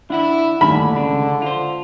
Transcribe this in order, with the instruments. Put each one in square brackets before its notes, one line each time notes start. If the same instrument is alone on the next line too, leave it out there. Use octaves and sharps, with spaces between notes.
[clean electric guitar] D4 F#5 [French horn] E4
[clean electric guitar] D#2 A2 G#5 [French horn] D3 [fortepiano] B5
[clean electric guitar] C#2 C#3 D4
F4 C5